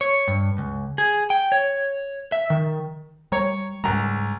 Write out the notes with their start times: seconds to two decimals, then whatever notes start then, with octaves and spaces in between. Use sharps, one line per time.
0.01 C#5
0.28 G2
0.58 C#2
0.98 G#4
1.30 G5
1.52 C#5
2.32 E5
2.50 D#3
3.32 G3 C#5 A#5
3.84 C#2 G#2 G3 A#5